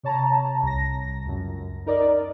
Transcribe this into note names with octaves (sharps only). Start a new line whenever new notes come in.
C3 C#5 A5 A#5
C2 A#6
C#2 F#2
D#4 A#4 D5 D#5